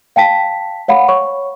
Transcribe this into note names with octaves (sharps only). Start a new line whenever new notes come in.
F5 G5 A5 B6
C#5 F5 F#5 B5
C#5 C#6